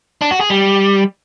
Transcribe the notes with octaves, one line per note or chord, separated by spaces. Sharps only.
D4
F#4
G#4
G3